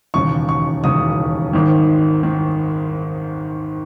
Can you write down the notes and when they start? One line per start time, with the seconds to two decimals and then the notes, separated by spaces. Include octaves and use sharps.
0.14 E1 D#2 C#3 C#6
0.49 C#6
0.84 E1 D#2 C#3 D#6
1.53 G#1 G#2 D#3
2.23 D#3